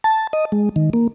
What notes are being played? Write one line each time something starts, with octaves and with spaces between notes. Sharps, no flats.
A5
D#5
G#3
D#3
A#3